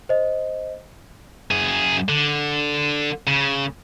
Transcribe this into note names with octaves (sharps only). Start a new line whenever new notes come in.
C5 D#5
F#2 G#4
D3
C#3